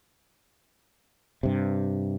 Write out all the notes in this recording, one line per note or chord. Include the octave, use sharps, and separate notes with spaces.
G2 C3